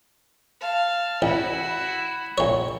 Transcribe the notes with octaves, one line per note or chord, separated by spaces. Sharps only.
F5 A5
A1 E4 F#4
A#1 C#5